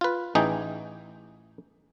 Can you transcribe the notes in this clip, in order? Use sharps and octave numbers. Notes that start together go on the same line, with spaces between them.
F4 B4
A1 E3 D#4 G#4 G5